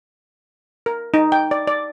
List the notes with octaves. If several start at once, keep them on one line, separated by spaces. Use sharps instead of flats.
A#4
D#4
G5
D5
D5